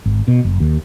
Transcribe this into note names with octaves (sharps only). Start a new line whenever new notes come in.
G#1
B2
F#1
D#2